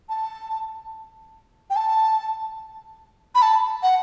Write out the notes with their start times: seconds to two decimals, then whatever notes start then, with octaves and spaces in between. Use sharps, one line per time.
0.09 A5
1.70 G5
1.76 A5
3.35 B5
3.42 A5
3.83 F#5